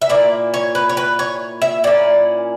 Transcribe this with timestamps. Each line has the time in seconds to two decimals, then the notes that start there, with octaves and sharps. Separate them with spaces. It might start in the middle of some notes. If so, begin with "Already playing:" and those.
0.02 E5
0.09 A#2 A#3 E4 D5
0.54 C#5
0.75 B4
0.89 C#5
0.97 B4
1.19 C#5
1.62 E5
1.84 A#2 A#3 C#4 E4 D5